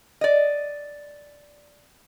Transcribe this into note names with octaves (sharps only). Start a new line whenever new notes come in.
D5 D#5